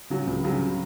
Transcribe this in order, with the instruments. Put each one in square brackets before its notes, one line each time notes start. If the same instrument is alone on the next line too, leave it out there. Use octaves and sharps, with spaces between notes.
[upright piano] C#3 F#3
C#2
C#3 F#3